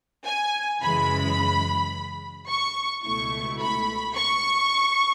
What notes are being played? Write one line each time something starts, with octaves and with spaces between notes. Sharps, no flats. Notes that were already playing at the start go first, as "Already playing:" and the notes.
G#5
F#2 C#3 E3 G#3 B5
C#6
C#2 B2 A3 E4 C#6
B5
C#6